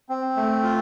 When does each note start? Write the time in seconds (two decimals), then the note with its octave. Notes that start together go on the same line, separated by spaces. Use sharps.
0.09 C4
0.36 A3
0.63 F4